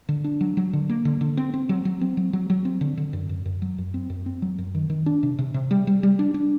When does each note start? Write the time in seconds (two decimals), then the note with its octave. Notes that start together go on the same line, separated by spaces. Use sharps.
0.09 D3
0.24 D4
0.41 F#3
0.57 F#3
0.73 D3
0.89 A#3
1.05 D3
1.21 D3
1.37 C4
1.54 C4
1.69 F#3
1.85 F#3
2.01 C4
2.17 F#3
2.33 F#3
2.50 F#3
2.65 C4
2.81 D3
2.97 D3
3.13 F#2
3.29 F#2
3.46 F#2
3.62 F#3
3.78 F#2
3.94 C4
4.10 F#2
4.26 C4
4.42 F#3
4.58 F#2
4.75 D#3
4.90 D#3
5.06 D4
5.23 C3
5.39 C3
5.54 C3
5.71 G3
5.87 G3
6.03 G3
6.19 D4
6.34 D4